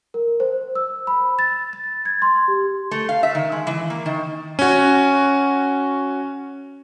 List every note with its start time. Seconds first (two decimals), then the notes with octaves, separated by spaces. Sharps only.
0.14 A#4
0.40 C5
0.75 E6
1.07 B5
1.39 A6
1.73 A6
2.05 G#6
2.22 C6
2.48 G4
2.91 A3
3.09 F5
3.23 E5
3.35 D#3
3.52 G#3
3.67 E3
3.90 A#3
4.06 D#3
4.59 C#4 F#4